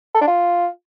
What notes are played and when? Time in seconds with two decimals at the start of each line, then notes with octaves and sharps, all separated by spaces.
0.15 A4
0.21 D4
0.28 F4